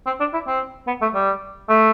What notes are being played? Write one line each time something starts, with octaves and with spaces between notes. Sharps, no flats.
C4
D4
E4
C4
B3
A3
G3
A3